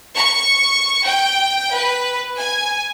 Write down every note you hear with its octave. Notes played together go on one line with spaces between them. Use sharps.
C#6
G5
B4
G#5